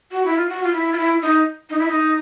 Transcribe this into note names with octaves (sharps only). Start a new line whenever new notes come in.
F#4
E4
F4
F#4
F4
E4
F4
E4
D#4
D#4
E4
D#4